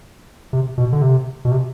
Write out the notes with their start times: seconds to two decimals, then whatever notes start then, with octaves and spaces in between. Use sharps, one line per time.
0.53 C3
0.78 B2
0.92 D3
1.02 C3
1.45 B2
1.52 C3